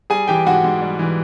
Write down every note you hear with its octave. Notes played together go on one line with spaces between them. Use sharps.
G3 G#4 G#5
E3 G4 G5
G#2 F#4 F#5
G#2
G3
E3